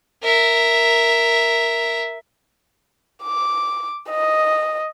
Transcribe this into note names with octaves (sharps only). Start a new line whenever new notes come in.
A#4 E5
D6
D#5